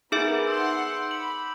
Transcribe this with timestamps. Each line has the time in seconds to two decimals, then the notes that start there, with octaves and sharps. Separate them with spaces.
0.12 B3 D#4 G#4 A#4 E5 D6 G6 D7
0.48 F#5 C6 E6
1.11 B5 F#7